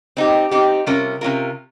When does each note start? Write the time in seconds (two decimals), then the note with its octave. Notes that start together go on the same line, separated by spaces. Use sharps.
0.17 C4 D#4 G4
0.51 C4 D#4 G4
0.86 C3 G3 C#4 F4 A#4
1.21 C3 G3 C#4 F4 A#4